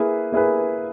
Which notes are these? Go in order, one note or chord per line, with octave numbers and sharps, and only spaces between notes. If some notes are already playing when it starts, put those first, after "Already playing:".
Already playing: A#3 E4 G#4 B4
A#3 E4 G#4 B4